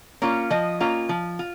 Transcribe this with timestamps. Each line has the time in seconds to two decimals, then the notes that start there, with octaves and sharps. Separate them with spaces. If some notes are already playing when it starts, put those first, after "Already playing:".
0.22 A#3 C#4 F4
0.50 F3 D#5
0.80 A#3 C#4 F4
1.09 F3
1.39 F4